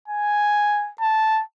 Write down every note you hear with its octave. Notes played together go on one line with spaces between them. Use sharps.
G#5
A5